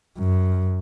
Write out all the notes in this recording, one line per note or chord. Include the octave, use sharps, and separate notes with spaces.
F#2